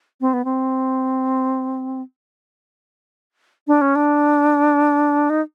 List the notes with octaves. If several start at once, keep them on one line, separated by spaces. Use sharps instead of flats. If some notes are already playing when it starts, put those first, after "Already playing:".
C4
B3
C4
D4
C#4
D4
D#4